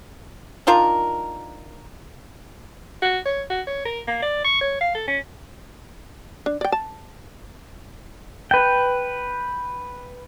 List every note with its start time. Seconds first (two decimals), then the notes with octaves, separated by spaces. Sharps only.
0.67 D#3 D4 F4 A#4
3.02 F#4
3.25 C#5
3.50 F#4
3.67 C#5
3.86 A#4
4.07 A#3
4.22 D5
4.45 C#6
4.61 C#5
4.81 F5
4.95 A4
5.08 C#4
6.46 D4
6.61 D5 G5
6.72 A5
8.51 B4 G5